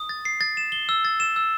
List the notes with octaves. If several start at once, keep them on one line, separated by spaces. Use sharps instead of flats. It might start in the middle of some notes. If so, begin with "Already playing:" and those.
Already playing: D#6
A6
C7
A6
E7
G7
E6
A6
E7
E6